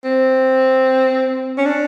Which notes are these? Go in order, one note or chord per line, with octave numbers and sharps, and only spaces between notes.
C4
C#4
D4